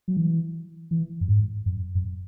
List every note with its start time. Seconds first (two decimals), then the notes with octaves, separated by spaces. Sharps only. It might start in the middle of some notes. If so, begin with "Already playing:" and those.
0.08 F#3
0.17 E3
0.91 E3
1.21 F#2
1.28 G#2
1.66 F#2
1.95 F#2